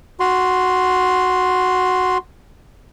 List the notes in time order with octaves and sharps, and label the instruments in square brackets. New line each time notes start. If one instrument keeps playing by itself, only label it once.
[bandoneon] F#4 C6